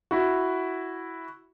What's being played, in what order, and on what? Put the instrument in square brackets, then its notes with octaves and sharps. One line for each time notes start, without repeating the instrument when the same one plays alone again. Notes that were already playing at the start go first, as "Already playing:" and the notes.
[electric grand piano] E4 F#4